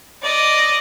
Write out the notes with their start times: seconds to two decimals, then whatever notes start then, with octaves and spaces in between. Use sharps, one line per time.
0.22 D5 D#5